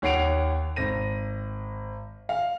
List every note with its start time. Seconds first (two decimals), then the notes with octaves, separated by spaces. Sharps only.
0.02 D#2 C#5 F#5 C7 D7 F7
0.76 G#1 A#6 D#7
2.29 F5